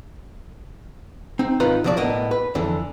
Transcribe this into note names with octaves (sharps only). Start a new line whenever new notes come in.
C4 D#4
G#2 D#3 F4 B4 D#5 A#5
C#2 F3 F#3 D4 D5
A2 A#3 B3 D#5
B4
F2 D3 E3